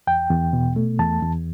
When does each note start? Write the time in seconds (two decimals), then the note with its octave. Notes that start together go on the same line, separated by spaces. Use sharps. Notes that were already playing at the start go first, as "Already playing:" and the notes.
0.07 E2 G5
0.30 E2
0.53 B2
0.76 A3
0.99 E2 A5
1.22 E2